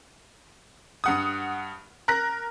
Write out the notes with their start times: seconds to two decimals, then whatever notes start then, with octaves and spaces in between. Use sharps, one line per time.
1.04 G2 F#5 D#6
2.08 A#4 F#6 A#6